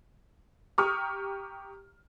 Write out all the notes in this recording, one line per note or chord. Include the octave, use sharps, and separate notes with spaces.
G4 A#5 C#6 D#6 F6